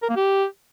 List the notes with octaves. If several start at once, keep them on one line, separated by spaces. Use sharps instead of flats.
A#4
A#3
G4